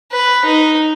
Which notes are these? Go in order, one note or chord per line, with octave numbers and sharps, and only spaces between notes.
B4
D#4